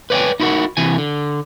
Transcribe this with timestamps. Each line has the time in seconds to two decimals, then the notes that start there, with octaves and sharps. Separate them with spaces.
0.10 B4 C#5 D5 F5 G5 G#5
0.40 D#4 E4 F#4 A#4 F#5
0.77 C3 E3 G#5
0.98 D3